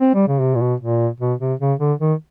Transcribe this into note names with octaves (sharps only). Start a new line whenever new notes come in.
C4
G3
C#3
C3
A#2
B2
A#2
B2
C3
C#3
D3
D#3